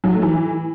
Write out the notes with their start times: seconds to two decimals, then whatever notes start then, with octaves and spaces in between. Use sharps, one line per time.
0.04 F#3
0.13 A3
0.22 E3